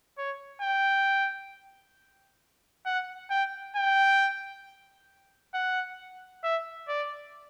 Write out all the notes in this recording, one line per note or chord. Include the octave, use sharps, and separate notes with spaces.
C#5
G5
F#5
G5
G5
F#5
E5
D5